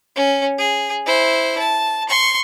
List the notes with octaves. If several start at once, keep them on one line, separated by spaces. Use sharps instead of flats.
C#4
G#4
E4 C5
A5
C6 C#6